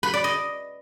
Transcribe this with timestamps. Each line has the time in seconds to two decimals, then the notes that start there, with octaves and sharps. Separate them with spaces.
0.03 B4
0.14 D5
0.24 D#5